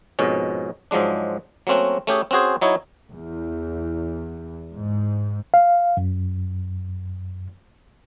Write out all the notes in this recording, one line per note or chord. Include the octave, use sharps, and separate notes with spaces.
F2 G#2 B2 C#4
G#2 F3 F#3 G#3 D4
F#3 A3 A#3 C4 C#4 F#4
A3 C#4 G4 G#4
C4 C#4 F#4 G#4 C5
F#3 D#4 E4 C#5
E2
G#2
F5
F#2